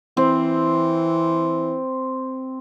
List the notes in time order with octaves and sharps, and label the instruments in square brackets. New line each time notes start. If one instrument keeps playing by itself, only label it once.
[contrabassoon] E3 [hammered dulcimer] C4